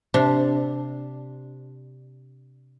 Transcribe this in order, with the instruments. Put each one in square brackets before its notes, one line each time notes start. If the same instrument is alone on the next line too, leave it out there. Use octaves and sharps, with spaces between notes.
[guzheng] C3 D4